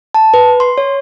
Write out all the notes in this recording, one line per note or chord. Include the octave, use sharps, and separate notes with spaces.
A5
B4
C6
C#5